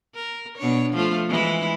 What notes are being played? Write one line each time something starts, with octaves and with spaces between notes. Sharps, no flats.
A#4
B2 D4 C#5
F3 A3 F4
E3 G#3 E4